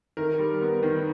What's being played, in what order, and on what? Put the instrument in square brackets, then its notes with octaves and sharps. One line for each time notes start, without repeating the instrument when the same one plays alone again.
[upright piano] D#3 A#4
G3
B3
D#3